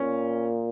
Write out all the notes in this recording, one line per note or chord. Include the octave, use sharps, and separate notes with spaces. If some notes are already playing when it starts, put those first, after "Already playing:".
Already playing: A#2 C#4